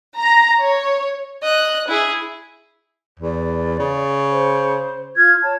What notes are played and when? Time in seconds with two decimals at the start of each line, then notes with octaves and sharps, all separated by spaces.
0.18 A#5
0.59 C#5
1.42 D#5 F#6
1.88 E4 G#4
3.20 E2 D5
3.79 C#3
4.29 C5
5.16 F4 F6 G#6
5.40 C#5 A5